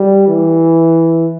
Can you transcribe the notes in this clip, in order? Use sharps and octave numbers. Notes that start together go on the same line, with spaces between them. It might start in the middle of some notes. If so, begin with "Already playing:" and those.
Already playing: G3
E3